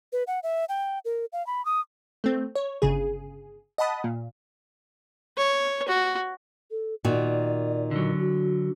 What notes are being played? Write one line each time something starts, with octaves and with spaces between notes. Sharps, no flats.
B4
F#5
E5
G5
A#4
F5
B5
D#6
A3 C4
C#5
G1 C#3 G#4
D#5 F#5 A5 B5 D#6
A#2
C#5
F#4
A4
A#2 D#3 F#4 D5
D3 F#3
F#4